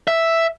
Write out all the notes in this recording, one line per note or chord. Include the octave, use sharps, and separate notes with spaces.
E5